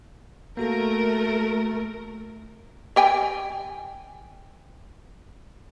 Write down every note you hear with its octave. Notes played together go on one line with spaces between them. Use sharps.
A3 A#3 F#4 A4 A#4
G4 G5 G#5